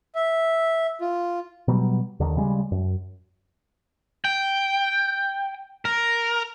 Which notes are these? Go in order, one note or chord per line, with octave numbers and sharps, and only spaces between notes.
E5
F4
B2 F#3 G3
D#2 D3 D#3
C#3 G3 G#3
F#2
G5
A#4